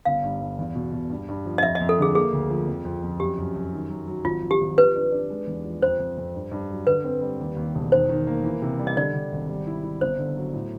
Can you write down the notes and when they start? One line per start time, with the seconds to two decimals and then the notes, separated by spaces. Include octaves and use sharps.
0.05 G1 F5
0.23 G2
0.41 G2
0.59 E2
0.75 B2
0.92 B2
1.10 G2
1.28 G2
1.46 F3
1.58 D#5
1.63 F2 E5
1.75 D#5
1.81 F2
1.89 A4
1.98 D3 G#4
2.15 A#3 G#4
2.32 D2
2.50 F3
2.67 F2
2.85 F2
3.03 F2
3.20 F#2 G4
3.38 F#2
3.56 F#2
3.72 D#3
3.90 F#3
4.07 F#3
4.25 G#1 F4
4.42 F3
4.51 G4
4.60 G#1
4.78 F3 B4
4.95 D4
5.12 D4
5.30 G#3
5.47 E2
5.64 F3
5.82 F2 C5
5.99 F2
6.17 F2
6.35 G2
6.51 G2
6.70 F#3
6.86 D3 B4
7.04 C4
7.21 G3
7.40 D#2
7.56 D#2
7.75 E1
7.92 D#3 C5
8.09 D#3
8.27 A#3
8.44 E3
8.62 C3
8.79 G3
8.87 D#5
8.96 D3 D5
9.14 D3
9.32 G#1
9.49 G3
9.67 E4
9.83 E4
10.01 G1 C5
10.19 D3
10.36 F#3
10.53 A2